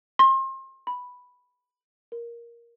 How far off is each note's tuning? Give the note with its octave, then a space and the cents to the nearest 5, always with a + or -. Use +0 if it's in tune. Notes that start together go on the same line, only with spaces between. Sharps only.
C6 +35
B5 +0
A#4 +10